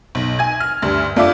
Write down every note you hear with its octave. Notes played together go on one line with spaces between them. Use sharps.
B1
G#5 G#6
F6
D2 G2
F2 D4 F4 E5 F5 D6